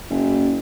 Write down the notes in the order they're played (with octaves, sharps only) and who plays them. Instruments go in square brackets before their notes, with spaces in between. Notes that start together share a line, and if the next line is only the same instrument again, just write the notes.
[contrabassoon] F#1